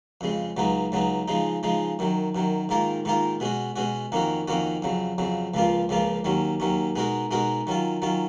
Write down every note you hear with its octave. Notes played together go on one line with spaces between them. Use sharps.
F2 C#3 G#3
C#2 C#3 F#3 B3 D#4
C#2 C#3 F#3 B3 D#4
C#3 F3 G#3 D#4
C#3 F3 G#3 D#4
F#2 D#3 F#3
F#2 D#3 F#3
G#2 D#3 A#3 F4 A#4
G#2 D#3 A#3 F4 A#4
B2 G#3 C#4 F#4
B2 G#3 C#4 F#4
F2 D#3 A#3 C#4 F#4
F2 D#3 A#3 C#4 F#4
F2 C#3 F#3
F2 C#3 F#3
C#2 C#3 F3 A#3 F4
C#2 C#3 F3 A#3 F4
D#2 D#3 F#3 C#4
D#2 D#3 F#3 C#4
B2 G#3 D#4 F#4 A#4
B2 G#3 D#4 F#4 A#4
D#3 F#3 C#4 F4
D#3 F#3 C#4 F4